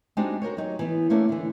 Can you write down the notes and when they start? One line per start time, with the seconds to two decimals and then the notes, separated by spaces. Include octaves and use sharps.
0.17 G#3 C4 D4 D#4 F#4 G4
0.42 F#4 A#4 C5 C#5
0.57 F#3 D#4 G4 C#5
0.79 E3 B3
1.10 A3 A#3 C#4 D4
1.29 D3 E3